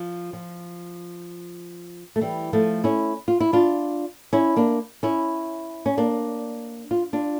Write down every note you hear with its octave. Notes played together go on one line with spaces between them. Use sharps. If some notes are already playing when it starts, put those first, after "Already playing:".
Already playing: F3
F3
A3
E3 G3
F3 A3
C#4 E4
F4
E4
D4 F4
C#4 E4
A#3 D4
C#4 E4
C#4
A#3 D4
F4
D4 F4